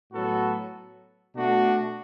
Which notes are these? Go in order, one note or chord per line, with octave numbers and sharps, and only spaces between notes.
A2 F#3 B3 F#4 A4
B2 A3 D4 F#4